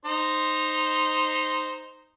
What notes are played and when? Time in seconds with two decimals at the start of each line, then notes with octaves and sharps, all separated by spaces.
0.05 D#4 C5 C6